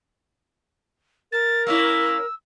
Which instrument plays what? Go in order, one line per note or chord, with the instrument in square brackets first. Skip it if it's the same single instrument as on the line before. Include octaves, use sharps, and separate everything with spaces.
[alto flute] A#4 [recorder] A6
[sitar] A#3 C#4 E4 [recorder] E6